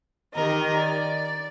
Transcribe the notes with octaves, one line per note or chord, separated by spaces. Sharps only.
D#3 G4 A#4 D#5
D5